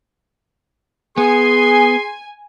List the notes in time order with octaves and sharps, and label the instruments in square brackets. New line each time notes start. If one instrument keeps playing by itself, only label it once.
[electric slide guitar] B3 [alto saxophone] G#4 [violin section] G#5 [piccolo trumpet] C6